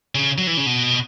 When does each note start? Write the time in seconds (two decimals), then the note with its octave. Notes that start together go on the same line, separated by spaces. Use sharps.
0.15 C#3
0.38 F#3
0.47 E3
0.57 C#3
0.66 B2